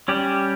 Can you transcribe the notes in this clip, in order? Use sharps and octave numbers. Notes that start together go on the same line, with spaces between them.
G3 C#4 G4